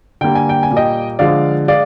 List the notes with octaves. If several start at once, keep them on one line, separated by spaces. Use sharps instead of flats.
D3 G3 A#3 G5
G#5
G5
G#5
A#2 G3 A#3
D#5 G5
D3 F3 G#3 D5 F5
G#3 D5 F5